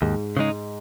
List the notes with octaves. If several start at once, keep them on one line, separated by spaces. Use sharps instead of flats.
D#2 G#2
C#3 G#3 D#4